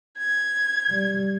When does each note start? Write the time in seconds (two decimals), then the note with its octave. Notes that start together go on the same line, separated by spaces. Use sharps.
0.18 G#6
0.89 G3